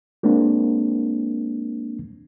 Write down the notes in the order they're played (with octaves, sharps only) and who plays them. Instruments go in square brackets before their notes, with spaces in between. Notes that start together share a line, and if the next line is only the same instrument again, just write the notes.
[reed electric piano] G#3 A#3 C4 D4